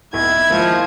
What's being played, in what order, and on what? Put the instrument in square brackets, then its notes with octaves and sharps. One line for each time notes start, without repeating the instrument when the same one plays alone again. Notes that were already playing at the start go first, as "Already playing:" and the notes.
[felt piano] B1 [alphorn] E4 [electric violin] G#6
[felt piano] D#2 G#3 [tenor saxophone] F3